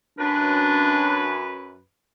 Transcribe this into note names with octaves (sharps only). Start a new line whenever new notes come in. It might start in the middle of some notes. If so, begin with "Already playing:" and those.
F#2 D4 B4